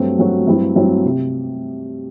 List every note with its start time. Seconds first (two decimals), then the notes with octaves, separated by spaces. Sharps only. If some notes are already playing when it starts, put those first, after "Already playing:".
Already playing: G2 F#3 A3 C4 F#4
0.19 G2 F#3 A3 C4 F#4
0.47 G2 F#3 C4 E4
0.76 G2 F#3 C4 E4
1.05 C3